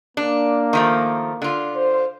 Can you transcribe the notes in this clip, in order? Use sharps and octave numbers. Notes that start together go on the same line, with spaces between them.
A#3 D4
D#3 F3 A3
D3 F4
C5